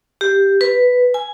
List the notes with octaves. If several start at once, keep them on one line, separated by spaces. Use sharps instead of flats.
G4
B4
G#5